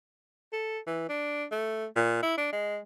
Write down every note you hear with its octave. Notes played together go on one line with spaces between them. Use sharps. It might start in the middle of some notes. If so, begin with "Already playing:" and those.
A4
E3
D4
A3
A#2
E4
D4
G#3